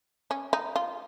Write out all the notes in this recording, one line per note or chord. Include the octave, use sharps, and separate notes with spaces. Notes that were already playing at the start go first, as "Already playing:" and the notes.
C#4
D#4
F4